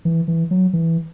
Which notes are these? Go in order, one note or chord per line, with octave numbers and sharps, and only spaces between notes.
E3
E3
F#3
E3